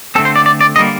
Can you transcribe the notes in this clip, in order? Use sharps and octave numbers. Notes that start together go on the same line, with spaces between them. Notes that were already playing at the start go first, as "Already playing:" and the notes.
D3 A3 C4 A4
C5
D5
D5
D5
D3 G3 A#3 D#5